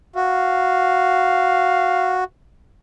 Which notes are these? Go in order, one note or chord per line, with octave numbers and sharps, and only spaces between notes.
F#4 F5